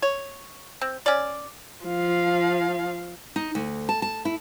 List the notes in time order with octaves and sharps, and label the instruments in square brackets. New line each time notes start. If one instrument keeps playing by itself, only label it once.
[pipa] C#5
C4
C#4 D5
[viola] F3 F5
[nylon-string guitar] D#4
D2
A5
A5
E4